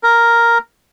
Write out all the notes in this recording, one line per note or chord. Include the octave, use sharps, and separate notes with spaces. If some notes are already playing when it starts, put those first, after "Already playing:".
A#4